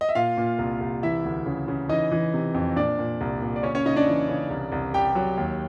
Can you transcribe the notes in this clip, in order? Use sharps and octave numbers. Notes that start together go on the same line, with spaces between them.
D#5
E5
A#2 F4 F5
A#2
C2
C2
E3 E4 E5
D2
C#3
C#3
E3 D#4 D#5
E3
C3
F2
A#2 D4 D5
A#2
C2
A#2
D5
C#3 C#4 C#5
C#4 C#5
C#3 D#4 D#5
D4 D5
E3
C#3
C2
C2
C2 G4 G5
F#3
D#2